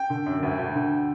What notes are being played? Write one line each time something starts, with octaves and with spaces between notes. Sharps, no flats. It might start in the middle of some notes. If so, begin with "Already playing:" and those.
Already playing: G5
D3
F#2
D2
D2
D3